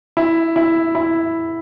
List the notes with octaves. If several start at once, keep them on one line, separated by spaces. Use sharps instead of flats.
E4
E4
E4